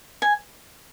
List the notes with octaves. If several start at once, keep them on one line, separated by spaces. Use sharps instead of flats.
G#5